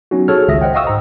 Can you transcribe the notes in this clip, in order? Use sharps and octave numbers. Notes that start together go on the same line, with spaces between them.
F#3 B3 C#4 D#4 F#4
F#4 G#4 A4 C#5 F6
G1 C#2 D#3 E5 D#6 A#6
C5 D#5 F#5 G5
D#5 F5 G5 C#6 D#6 E6
G#2 C5 A#5